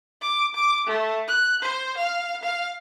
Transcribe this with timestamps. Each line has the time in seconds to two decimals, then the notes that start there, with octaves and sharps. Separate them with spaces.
0.21 D6
0.55 D6
0.87 A3
1.27 F#6
1.62 C5
1.97 F5
2.43 F5